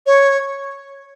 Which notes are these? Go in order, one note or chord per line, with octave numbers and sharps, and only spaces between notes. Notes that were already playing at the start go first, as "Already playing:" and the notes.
C#5